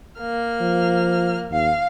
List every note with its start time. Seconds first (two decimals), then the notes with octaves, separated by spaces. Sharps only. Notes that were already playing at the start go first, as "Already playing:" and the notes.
0.20 A#3 F6
0.61 F3
1.50 D#2 F5